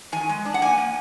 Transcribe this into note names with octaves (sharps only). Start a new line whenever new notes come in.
D#3 G#5
G#3
D4
F#5
A#3 G#5
A#3